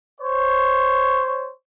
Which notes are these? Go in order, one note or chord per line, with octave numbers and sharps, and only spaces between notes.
C5 C#5